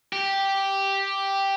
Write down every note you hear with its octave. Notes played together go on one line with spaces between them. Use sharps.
G4